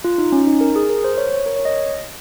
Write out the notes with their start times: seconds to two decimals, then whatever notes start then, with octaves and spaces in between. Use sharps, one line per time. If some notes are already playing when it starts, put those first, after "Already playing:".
0.04 F4
0.18 D#4
0.32 C#4
0.47 D#4
0.61 A#4
0.76 G#4
0.90 A#4
1.04 C5
1.18 C#5
1.33 C#5
1.46 A#4
1.56 C#5
1.65 D#5